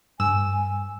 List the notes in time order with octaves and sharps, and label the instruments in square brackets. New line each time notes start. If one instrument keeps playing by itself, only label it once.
[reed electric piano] G2 [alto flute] G#5 [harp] E6